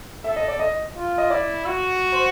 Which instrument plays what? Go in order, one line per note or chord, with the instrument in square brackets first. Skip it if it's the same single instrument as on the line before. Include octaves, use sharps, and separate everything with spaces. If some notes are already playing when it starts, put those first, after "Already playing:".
[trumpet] A4 [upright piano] E5
[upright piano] D#5
D5
D#5
[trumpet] F4
[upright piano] D#5
[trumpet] E4 [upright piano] D5
[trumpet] F#4
[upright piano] C5